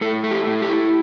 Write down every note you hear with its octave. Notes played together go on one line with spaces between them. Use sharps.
A2 A4
A3
G4
A2
G4
E4